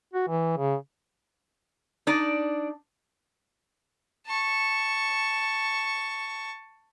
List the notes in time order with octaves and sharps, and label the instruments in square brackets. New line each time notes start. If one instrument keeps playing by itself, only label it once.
[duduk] F#4
E3
C#3
[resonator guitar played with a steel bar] D4 D#4 D5
[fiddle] A5 C#6